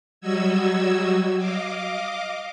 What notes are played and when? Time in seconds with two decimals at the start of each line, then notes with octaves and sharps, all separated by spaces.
0.21 F#3 G3 F#4 D#5 E6 G#6
1.38 D#5 F5 D6